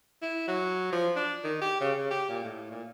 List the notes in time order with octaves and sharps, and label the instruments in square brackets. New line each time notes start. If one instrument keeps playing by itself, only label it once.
[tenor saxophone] E4
F#3
F3
D4
D#3
G4
C#3
C#3
G4
A#2
A2
A#2